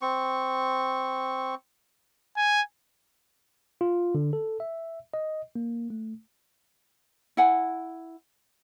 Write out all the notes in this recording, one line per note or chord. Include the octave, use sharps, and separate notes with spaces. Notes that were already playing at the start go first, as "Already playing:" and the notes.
C4 C#6
G#5
F4
D3
A4
E5
D#5
A#3
A3
E4 F#5 G#5